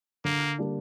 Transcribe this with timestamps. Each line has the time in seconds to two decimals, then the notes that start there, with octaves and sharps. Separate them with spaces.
0.25 D3 A#3
0.58 G3 A#3 D4